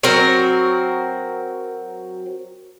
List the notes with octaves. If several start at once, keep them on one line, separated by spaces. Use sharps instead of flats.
F#3 C4 F#4 A#4